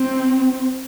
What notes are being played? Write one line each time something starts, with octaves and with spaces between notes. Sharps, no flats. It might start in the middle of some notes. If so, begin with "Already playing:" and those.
Already playing: C4